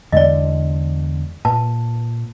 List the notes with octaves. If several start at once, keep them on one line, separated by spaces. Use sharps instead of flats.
E2 D3 G#3 D5 D#5
A#2 B4 A5